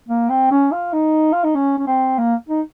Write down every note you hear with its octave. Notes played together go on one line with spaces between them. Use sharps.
A#3
C4
C#4
F4
D#4
F4
D#4
C#4
C#4
C4
A#3
D#4